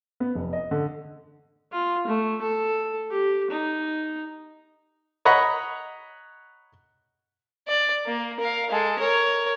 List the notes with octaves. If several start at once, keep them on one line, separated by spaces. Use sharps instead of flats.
B3
F1
D#5
D3
F4
A3
A4
G4
D#4
C#5 D#5 F#5 A#5 B5 C#6
D5
A#3
A#4 F5
G#3 A4
A#4 C#5